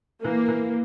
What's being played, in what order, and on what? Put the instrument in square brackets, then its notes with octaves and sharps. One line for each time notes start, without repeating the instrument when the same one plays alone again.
[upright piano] E3 [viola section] A#3
[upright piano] E3